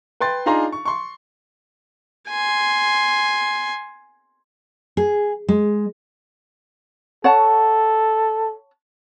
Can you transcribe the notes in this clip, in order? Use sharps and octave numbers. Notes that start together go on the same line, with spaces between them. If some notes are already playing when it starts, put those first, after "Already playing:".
B4 G5 C6 A6
D4 D#4 F4 G#4 A#5 C6
C#6
C6 C#6
G#5 C6
G#4
G#3
A4 C#5 F#5 A5